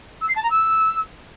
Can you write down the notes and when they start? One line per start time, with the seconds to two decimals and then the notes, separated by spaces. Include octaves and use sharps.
0.21 E6
0.29 C7
0.36 A5
0.43 A#5
0.50 E6